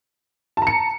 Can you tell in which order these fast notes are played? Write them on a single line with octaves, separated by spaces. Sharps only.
A5 A#5 C#7